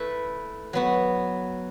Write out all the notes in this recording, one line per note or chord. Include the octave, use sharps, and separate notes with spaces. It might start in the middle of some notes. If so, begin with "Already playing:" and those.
Already playing: A3 E4 B4
F#3 B3 F#4